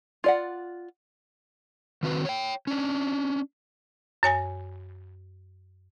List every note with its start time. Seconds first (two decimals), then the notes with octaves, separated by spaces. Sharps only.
0.24 F4 D5 F#5
2.03 D#3 C4 F#4 B4
2.25 C#5 G5
2.67 C#4 D4
4.23 F#2 C#5 G#5 A#6